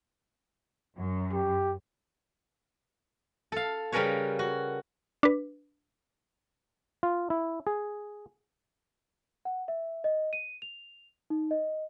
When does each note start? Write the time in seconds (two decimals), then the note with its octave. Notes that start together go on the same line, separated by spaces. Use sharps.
0.97 F#2
1.34 G4
3.52 A4 F5
3.92 C#3 G3 C#4 A#4 B4 C#5
4.39 F#4
5.23 D4 B4
7.03 F4
7.30 E4
7.67 G#4
9.45 F#5
9.68 E5
10.04 D#5
10.33 D#7
10.62 F7
11.30 D#4
11.51 D#5